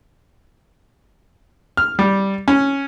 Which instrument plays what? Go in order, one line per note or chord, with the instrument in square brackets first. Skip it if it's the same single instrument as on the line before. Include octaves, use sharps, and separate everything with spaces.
[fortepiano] F6
G3
C#4